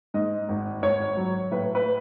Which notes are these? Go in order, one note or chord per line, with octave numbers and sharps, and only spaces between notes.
G#2 D#5
G#1
G#1 C#5
F#3
A2 B4
B4